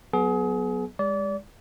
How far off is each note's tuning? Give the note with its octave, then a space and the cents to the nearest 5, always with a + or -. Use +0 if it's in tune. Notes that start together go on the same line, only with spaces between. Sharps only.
F#3 +0 B3 +0 G#4 +30
G#3 -30 D5 -30